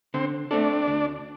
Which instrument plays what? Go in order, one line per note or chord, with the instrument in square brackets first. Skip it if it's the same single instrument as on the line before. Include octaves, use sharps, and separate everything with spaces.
[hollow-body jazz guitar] D3 [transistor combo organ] C4
[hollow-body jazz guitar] A3 C4 A4 [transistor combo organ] D4
[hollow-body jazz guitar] D2